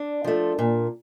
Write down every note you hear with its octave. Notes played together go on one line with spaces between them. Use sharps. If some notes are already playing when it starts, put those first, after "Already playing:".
Already playing: D4
F3 A3
A#2